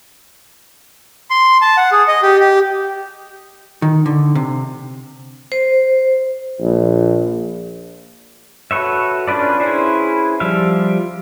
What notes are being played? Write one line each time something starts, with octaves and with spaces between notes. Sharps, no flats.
C6
A5
F#5
G#4
D#5
G4
G4
D#3
D3
C3
C5
A#1
F#4 A4 B4 C#5 E5
C#4 D4 F4 B4 D5
C#4 E4 G#4 B4 C5
F3 G3 E5 F5